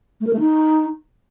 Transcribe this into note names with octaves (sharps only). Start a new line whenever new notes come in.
A3
A#4
A3
D#4